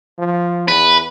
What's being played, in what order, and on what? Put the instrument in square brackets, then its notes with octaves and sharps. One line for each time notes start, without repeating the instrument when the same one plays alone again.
[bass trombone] F3
[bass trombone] E2 [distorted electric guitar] B4